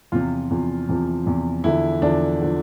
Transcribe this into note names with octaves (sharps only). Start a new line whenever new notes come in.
E2 C3 F3 F4
E2 C3 F3
E2 C3 F3
E2 C3 F3
E2 D3 F3 E4
E2 D3 F3 D4
D3 F3